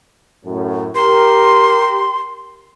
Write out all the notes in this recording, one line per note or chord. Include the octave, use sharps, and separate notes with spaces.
F#2 A2
G4 A#4 C6